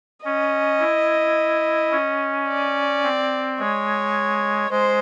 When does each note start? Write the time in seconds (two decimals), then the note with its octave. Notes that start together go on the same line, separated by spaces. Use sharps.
0.25 C#4 D#5
0.80 E4
1.91 C#4
2.48 D5
3.03 C4
3.59 G#3 C#5
4.70 G#3 C5